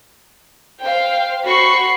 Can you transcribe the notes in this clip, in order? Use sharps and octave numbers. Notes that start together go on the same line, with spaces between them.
C5 F5 G5
F#4 C5 B5 C#6 C7